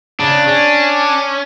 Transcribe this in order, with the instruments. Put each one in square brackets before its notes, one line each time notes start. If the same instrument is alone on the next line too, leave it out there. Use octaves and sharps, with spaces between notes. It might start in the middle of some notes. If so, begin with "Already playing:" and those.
[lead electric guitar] C#3 [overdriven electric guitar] D4
[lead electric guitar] C#4